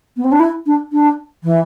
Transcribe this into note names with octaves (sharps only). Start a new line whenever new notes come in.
B3
C4
D4
E4
D4
D4
E3